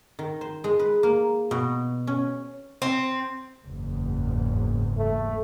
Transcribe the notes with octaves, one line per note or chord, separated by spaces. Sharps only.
D#3
C5
G#3
B4
A#3
B2
C#4
C4
F#1 E2 G#2
A3